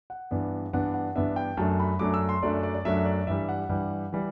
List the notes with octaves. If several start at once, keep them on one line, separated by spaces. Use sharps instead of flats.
F#5
G2 E3 B3 D4
G2 E3 B3 D4 F#5
F#5
G2 E3 B3 D4 E5
G5
F#2 F#3 A3 D4 A5
B5
F#2 F#3 A3 D4 D6
E6
C6
F#2 F#3 A3 D4 D5
D5
D5
D5
F#2 F#3 A3 D4 E5
D5
G2 E3 G3 E5
F#5
G2 E3 G3
E3 G3